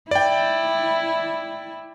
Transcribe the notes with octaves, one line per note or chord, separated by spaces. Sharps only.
E4 D5 G5